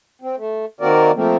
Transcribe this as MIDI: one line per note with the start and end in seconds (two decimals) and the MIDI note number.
0.22 0.36 60
0.37 0.65 57
0.81 1.11 51
0.81 1.11 58
0.81 1.11 60
0.81 1.11 66
0.81 1.11 70
0.81 1.11 74
1.15 1.37 53
1.15 1.37 57
1.15 1.37 58
1.15 1.37 60